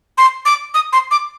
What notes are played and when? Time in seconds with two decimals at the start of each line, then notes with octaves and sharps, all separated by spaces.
0.18 C6
0.45 D6
0.74 D#6
0.93 C6
1.11 D6